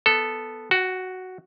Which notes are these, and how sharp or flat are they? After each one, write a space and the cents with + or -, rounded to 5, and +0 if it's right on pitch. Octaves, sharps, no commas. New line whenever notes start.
B3 +0 A4 +0
F#4 +0 G5 -35